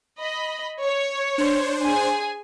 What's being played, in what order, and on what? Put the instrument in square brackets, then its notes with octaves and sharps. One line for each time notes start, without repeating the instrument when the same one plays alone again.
[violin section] D#5 B5
C#5
[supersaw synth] D4 C5
[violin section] G#4 G#5